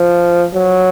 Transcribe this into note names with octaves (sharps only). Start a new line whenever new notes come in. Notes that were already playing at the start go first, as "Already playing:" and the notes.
Already playing: F3
F#3